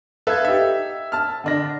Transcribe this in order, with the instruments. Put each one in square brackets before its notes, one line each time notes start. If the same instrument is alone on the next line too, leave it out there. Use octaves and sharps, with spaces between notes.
[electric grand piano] A4 B4 E5 [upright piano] F5 G#6
[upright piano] D#4 G4 [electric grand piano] E5
[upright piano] A5 F6
D3 D4 A#6